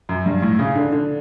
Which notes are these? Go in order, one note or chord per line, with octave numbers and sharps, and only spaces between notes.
F#2
G2
A2
C#3
D3
D3